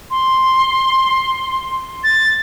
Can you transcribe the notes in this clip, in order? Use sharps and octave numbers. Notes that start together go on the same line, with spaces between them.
C6
A6